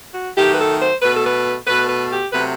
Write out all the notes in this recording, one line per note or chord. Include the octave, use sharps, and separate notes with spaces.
F#4
D#3 F#3 A3 G4
B4
A4
C5
B2 A3 B4
A4
B4
B2 A3 B4
B4
G4
C3 F#3 A3 B4